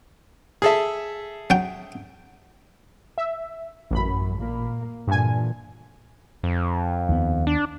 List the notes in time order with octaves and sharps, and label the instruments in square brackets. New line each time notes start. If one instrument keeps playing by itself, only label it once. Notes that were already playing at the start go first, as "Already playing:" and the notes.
[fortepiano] G#4 A4 E5
[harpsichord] F#3 G5
[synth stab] E5
[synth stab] A1 B5 [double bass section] F#2
[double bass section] A#2 A#3
[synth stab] G2 G#5 [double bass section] A#2 D3 E3
[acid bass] F2
[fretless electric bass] D#2 B3
[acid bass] D4